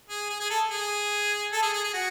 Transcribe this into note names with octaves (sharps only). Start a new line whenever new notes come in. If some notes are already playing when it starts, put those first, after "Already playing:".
G#4
G#4
G#4
A4
G#4
A4
G#4
G#4
G#4
F#4